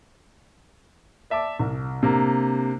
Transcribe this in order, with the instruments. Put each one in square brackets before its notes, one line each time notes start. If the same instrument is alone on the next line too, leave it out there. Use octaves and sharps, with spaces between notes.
[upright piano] D5 E5 A5 D6
C2
C3 A#3 D4